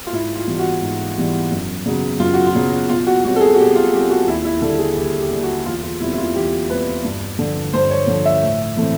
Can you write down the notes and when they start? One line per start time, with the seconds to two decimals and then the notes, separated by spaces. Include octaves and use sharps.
0.07 F4
0.13 G#2 E4
0.36 F4
0.47 E3 G3 B3
0.59 F#4
0.82 G#2
1.17 E3 G3 B3
1.52 F#2
1.86 C#3 F#3 B3
2.20 F#2 F4
2.34 F#4
2.47 F4
2.55 C#3 F#3 B3
2.89 B2 F4
3.07 F#4
3.24 G3 C4 F#4
3.36 A4
3.41 G#4
3.54 F#4
3.58 B2 G4
3.76 F4
3.93 G3 C4 G4
4.10 F#4
4.27 D#2 E4
4.44 E4
4.62 D3 G3 A#3 A4
4.79 G#4
4.96 D#2 G4
5.19 G4
5.31 D3 G3 A#3
5.43 F#4
5.66 E2 F4
5.83 F4
6.00 B2 G3 C4 E4
6.13 E4
6.18 F4
6.35 E2 G4
6.69 B2 G3 C4 B4
7.04 G2
7.39 D3 F3
7.73 G2 C5
7.91 C#5
8.07 D3 F3
8.25 E5
8.42 A2
8.77 E3 A3 C4